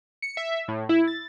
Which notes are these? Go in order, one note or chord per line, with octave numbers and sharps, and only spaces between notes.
C#7
E5
A2
E4
A6